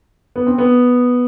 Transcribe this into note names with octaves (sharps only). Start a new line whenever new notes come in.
B3
C4
B3